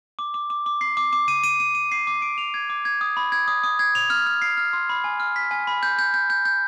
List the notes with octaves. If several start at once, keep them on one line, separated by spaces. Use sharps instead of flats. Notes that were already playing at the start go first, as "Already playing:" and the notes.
D6
D6
D6
D6
C7
D6
D6
D#7
D#7
D#7
D#7
C7
D6
D7
F7
G#6
D6
G#6
D#6
B5
G#6
D#6
D#6
G#6
F7
F6
F6
C7
F6
C6
B5
G#5
F6
B6
G#5
B5
G6
G6
G6
G6
G6